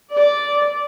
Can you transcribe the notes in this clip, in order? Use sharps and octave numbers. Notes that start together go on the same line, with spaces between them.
D5